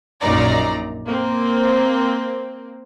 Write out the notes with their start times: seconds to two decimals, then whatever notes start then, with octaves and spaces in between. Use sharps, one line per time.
0.22 A#1 F#2 A#2 D#4 D5 A#5
1.05 A#3 C4